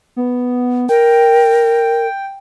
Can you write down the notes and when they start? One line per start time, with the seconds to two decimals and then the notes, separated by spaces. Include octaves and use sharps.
0.16 B3
0.89 A#4 G5